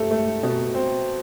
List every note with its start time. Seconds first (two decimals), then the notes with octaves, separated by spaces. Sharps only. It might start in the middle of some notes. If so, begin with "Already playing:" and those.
Already playing: A3 G4 A4
0.11 A3
0.43 B2
0.74 C4